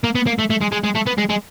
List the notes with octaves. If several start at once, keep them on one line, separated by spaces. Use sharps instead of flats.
A#3
B3
A#3
A3
A3
G#3
G#3
G#3
A3
B3
G#3
G#3